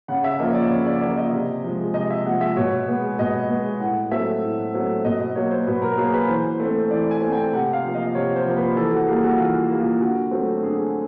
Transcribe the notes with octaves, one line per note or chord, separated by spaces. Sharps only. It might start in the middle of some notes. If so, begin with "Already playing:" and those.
C#3 F#5
E5
F3 A#3 D#5
C#5
D5
C#3 C#5
D5
A#3 D5
F3
D#5
C3
F3 G#3
C3 D#5
E5
F3 G#3 F#5
E5
B2 C#5
G#3 B3
B2 D#5
G#3 B3
A2 F#5
F#3 A3 C4 E5
A2
F#3 A3 C4
B2 D#5
D#5
F#3 A#3 C#5
C5
B2 B4
A#4
F#3 A#3 G#4
B4
E3 C5
A3 C4
E3 D5
G#5
A3 C4
G5
C3 F#5
F5
F3 A#3
D#5
C3 C#5
C5
F3 A#3
B4
E3 A4
F#4
G3 A#3 G#4
F#4
E3 F4
G3 A#3
F4
D3 F#4
F#3 A3 C4
D3 G#4